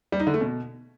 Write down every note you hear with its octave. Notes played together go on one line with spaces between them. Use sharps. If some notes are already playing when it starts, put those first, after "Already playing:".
G3
D#4
D3
A3
B2